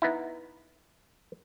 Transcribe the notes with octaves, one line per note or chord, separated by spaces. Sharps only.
B3 D#4 E4